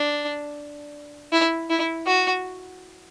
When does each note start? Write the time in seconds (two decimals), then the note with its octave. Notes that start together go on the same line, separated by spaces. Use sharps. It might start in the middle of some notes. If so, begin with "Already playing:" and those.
Already playing: D4
1.32 E4
1.70 E4
2.07 F#4